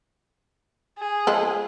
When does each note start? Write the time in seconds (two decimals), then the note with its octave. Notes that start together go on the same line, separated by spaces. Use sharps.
0.98 G#4
1.27 F3 G#3 A4